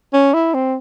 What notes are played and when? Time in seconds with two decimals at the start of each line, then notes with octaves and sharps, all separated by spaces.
0.13 C#4
0.34 E4
0.54 C4